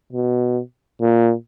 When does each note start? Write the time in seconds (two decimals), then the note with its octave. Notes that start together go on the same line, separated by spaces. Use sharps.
0.13 B2
1.02 A#2